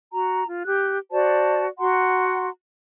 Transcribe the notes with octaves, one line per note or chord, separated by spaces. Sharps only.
F#4 A#5
F4
G4 F#6
F#4 C5 D5 A5
F#4 F#5 A#5 C6